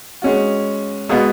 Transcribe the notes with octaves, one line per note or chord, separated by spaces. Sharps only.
G#3 C#4 F#4
B2 G#3 B3 F#4